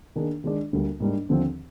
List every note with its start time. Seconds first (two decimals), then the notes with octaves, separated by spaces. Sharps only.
0.16 D#3 A#3 D4 G#4
0.44 D#3 G#3 D4 G#4 D5
0.73 D2 D3 G3 A#3
1.00 G#2 G3 A#3 D4
1.29 D#2 D3 F3 C4